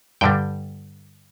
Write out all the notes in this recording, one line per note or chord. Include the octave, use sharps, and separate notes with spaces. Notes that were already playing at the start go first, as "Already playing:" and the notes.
G2 D3 G3 G5